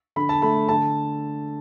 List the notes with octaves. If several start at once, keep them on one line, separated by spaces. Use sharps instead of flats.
D3 B5
A5
A3 B5
D3 A5